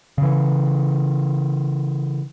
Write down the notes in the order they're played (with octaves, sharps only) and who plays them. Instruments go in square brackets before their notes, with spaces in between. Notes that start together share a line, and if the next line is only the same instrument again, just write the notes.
[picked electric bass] C#3 E3